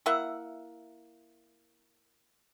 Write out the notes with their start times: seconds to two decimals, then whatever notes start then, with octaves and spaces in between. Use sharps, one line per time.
0.06 A#3 E4 E5 F#5